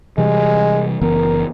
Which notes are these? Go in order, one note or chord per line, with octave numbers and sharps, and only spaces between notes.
C3 E3 G3 G#3
F#1 E3 B3 A#4